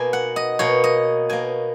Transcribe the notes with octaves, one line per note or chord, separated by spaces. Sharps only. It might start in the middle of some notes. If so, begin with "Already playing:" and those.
Already playing: B2 A#3 G#5
F#5
D#5
B2 A#3 C#5
D#5
B2 A#3 G#5